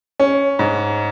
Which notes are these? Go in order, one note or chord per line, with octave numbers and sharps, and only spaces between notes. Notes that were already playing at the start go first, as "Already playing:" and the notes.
C#4
G#2